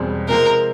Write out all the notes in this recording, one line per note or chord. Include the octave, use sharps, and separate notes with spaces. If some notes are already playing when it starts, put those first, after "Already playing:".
Already playing: E1 E2 B2 G3 C4
C3 F3 G#3 C4 A#4